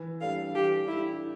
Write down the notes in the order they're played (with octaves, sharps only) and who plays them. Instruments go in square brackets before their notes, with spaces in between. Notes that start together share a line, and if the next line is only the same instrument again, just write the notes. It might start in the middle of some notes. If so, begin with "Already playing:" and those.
Already playing: [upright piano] E3
[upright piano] G3 D4 A4 [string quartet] F5
[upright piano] E3 [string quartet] G4
[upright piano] G3 D4 A4 [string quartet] E4